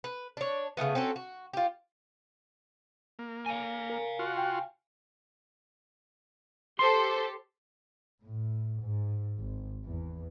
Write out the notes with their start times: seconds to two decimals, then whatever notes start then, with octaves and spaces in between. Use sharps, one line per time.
0.04 B4
0.37 D4 C#5
0.77 C#3 E3 A3 B3
0.95 C4 C#4 F#4 A4
1.16 F#4
1.53 F4 G4
3.19 A#3
3.46 F5 G#5
3.90 A#4
4.19 F4 F#4
4.38 G5
6.79 G4 A4 C5 C6
8.22 A2
8.83 G#2
9.39 G#1
9.84 E2